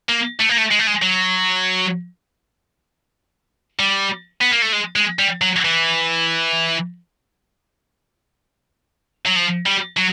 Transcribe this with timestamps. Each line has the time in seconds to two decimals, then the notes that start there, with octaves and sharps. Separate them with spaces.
0.09 A#3
0.40 A3
0.49 A#3
0.58 A3
0.71 G#3
0.79 A3
0.87 G#3
1.02 F#3
3.79 G3
4.41 B3
4.51 A#3
4.62 A3
4.72 G#3
4.96 G#3
5.19 G3
5.41 F#3
5.65 E3
9.26 F#3
9.36 F3
9.66 G3
9.97 F#3